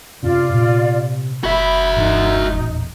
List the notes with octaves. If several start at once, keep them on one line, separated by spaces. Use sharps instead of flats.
F#2 C3 C#4 D4 F4 D5
A#2
F#1 F#4 E5 B5
C#2 G2 E3 D#4
D#1 A1 E2